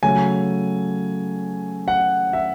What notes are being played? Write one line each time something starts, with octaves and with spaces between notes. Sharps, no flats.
C#3 F#3 A3 G#5
F#5
E5